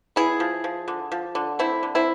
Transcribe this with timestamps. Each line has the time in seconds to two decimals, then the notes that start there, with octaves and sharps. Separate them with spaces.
0.16 B3 E4 G#4
0.40 F3
0.64 F3
0.88 D3
1.12 F3
1.35 D3
1.59 A3 C4 E4
1.83 D3
1.95 C4 E4